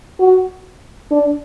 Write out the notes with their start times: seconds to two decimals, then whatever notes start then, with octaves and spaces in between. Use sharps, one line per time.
0.20 F#4
1.11 D4